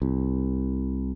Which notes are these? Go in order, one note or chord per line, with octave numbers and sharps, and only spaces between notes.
C2